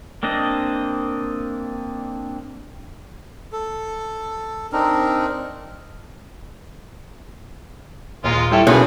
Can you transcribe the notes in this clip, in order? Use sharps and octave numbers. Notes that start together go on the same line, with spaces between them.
A#3 C4 D4 D#5
A4
C4 D4 D#4 A#4
D#2 A#2 G#3 F4
G3 E4 A4 C#5 E5 G5
B1 F#3 A#3 B3 C#4 G#4